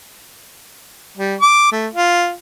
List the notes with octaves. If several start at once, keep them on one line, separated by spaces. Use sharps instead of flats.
G3
D6
A3
F4